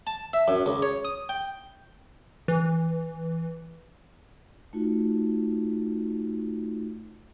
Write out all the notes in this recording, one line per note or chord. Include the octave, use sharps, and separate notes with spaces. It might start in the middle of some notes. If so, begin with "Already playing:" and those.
A5
E5
F#2
C#2
C#5
D#6
G5
E3
A3 D#4 F4 F#4